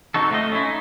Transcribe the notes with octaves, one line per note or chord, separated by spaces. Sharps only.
C4 D#4 F#4 A4
A3 F4 D#5
C#4 E4
D#4